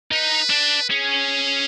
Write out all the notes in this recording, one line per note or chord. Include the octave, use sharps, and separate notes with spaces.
D#4 B4
D4
C#4 G#4